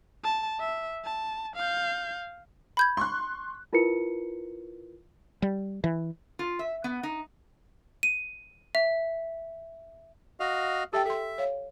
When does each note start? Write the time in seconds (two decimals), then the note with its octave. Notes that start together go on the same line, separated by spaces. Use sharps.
0.24 A5
0.60 E5
1.05 A5
1.56 F5 G6
2.77 B5 G6 G#6
2.97 C6 C#6 F#6
3.73 E4 F4 A#4 B4 C#7
5.42 G3
5.84 E3
6.39 F4
6.59 E5
6.84 B3
7.03 D#4
8.03 D#7
8.75 E5
10.40 F#4 D#5 F5
10.93 G4 A4 E5 G5
11.05 A4 E5 C6
11.38 C#5 F5